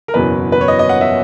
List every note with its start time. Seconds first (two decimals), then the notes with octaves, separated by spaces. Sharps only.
0.08 A#4
0.14 F#1 E2 B2 F#3 B4
0.52 B4
0.61 C#5
0.68 D#5
0.79 D#5
0.89 F#5
1.01 E5